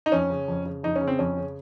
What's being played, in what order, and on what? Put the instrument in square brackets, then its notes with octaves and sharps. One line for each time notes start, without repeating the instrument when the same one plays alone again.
[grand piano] D#4
F2 C#4
C#3
F2
C#3
F2 D#4
C#4
C#3
C4
F2 C#4
C#3